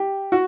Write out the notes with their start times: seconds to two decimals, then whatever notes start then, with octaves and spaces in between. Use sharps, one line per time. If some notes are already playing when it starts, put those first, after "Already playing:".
Already playing: G4
0.32 F#4